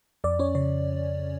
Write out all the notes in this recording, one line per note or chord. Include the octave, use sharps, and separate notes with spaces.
F2 D5
C#4 C#5
C#3 C#5